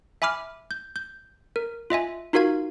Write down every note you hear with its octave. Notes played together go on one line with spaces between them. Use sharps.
E5 G#5 B5 D6 F6
G6
G6
A#4
F4 D#5 E5 G#5
D#4 F4 F#4 A#4 F5 G#6